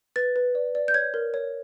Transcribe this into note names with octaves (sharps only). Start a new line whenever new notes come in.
B4 A6
B4
D5
D5
G6
C#5 G#6
A#4
C#5